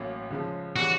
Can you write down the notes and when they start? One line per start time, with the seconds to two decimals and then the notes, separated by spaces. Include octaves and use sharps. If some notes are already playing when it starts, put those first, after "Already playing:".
Already playing: A1 A2 F#3 A#3
0.31 C#2 C#3 F3 G#3
0.76 C#3 E3 G3 F#4